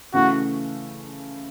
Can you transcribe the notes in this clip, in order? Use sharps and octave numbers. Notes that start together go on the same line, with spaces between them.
C#3 E3 A3 E4 F#4